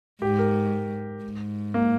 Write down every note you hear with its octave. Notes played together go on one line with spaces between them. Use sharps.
G#2 G4
A#4
G#2
A#3